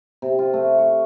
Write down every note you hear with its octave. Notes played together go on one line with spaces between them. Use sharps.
C3
F4
A3
C#6